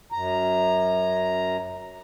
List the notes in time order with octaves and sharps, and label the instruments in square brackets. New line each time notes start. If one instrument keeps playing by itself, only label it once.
[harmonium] F#2 A#5